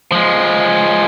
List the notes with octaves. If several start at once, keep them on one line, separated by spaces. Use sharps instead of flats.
F3 G#3